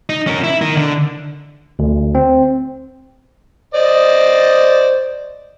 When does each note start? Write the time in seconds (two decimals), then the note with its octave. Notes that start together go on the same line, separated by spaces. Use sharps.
0.09 D#4
0.27 C#4 A#4
0.44 E4
0.61 D#4 A#4
0.77 D3
1.79 D2
2.15 C4
3.74 C5 D5 D#5